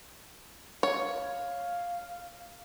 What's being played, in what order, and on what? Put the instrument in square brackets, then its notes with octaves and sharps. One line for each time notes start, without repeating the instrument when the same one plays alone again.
[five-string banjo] C#5 [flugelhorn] F5